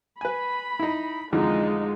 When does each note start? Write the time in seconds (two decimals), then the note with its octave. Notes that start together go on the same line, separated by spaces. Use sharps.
0.21 B4 G#5 B5
0.79 D#4 E4
1.33 F2 D3 E3 G#3 D#4 F4